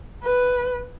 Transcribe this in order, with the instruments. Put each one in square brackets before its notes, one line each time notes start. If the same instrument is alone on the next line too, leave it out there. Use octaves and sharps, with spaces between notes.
[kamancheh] B4